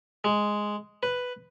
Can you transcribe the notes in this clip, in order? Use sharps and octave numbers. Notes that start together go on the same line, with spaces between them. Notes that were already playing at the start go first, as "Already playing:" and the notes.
G#3
B4